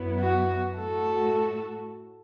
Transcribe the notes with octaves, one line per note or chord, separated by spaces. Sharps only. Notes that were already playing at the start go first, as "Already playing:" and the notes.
Already playing: F#2 F#3 B3 E4
F#4
A2 A3 F#4 A4